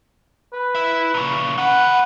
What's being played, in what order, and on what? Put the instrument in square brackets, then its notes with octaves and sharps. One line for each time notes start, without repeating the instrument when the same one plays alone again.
[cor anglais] B4
[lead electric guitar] E4 E5
A#2 C#3
[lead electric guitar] D#3 B4 [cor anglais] F#5